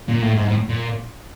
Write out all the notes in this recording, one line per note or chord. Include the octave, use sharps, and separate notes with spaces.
A#2
A2
G#2
A2
A#2